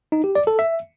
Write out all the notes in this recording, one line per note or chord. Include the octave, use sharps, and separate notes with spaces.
D#4
G4
D5
A4
E5